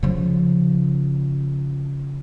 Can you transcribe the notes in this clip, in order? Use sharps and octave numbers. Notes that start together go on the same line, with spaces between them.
C#3 F3